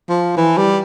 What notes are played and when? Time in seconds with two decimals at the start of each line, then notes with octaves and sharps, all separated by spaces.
0.09 F3
0.37 E3
0.57 G3